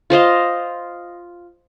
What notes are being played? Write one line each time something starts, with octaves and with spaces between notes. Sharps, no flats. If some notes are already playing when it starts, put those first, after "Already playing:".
F4 C5 D#5 F5